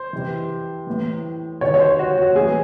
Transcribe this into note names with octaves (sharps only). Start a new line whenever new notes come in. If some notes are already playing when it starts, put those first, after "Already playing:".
Already playing: C5
C3 E3
A2 E3
C3 D#3 C#5
C#5
C5
F#4
F#4
A2 E3 G#4